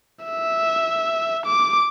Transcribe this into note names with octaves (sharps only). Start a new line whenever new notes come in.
E5
D6